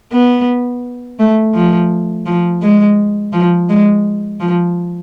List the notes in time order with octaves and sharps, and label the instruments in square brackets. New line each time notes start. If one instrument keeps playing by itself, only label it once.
[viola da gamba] B3
A3
F3
F3
G#3
F3
G#3
F3